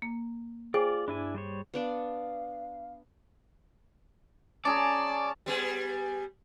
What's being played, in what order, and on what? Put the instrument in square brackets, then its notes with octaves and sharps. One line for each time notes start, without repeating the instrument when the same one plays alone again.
[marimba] A#3
[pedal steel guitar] F4 D5 [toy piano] G#4 [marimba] C5 G5 G#5
[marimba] G2 [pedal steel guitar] D4 E4 G#5
[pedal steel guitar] G3 C5 C#5
[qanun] B3 D4 D5 [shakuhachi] F5
[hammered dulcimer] C#4 G#4 A#5 [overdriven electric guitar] D5 [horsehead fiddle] A5 [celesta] D6
[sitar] G3 B3 G#4